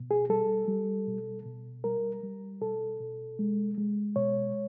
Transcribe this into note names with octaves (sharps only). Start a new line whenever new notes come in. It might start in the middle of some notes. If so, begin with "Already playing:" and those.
Already playing: B2
G#4
G3 A4
G3
B2
B2
G3 A#4
G3
B2 A4
B2
G#3
G#3
B2 C#5